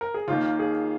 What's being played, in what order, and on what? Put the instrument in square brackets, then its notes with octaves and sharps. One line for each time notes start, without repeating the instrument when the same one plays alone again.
[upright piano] A#4
G#4
D#2 D#3 A#3 F4
G#4